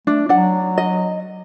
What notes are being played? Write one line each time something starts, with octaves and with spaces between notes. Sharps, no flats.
A3 D4
F#3 D4 F#5
D#5